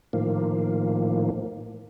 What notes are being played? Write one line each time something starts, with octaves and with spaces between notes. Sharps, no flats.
A2 D#3 F3 A#3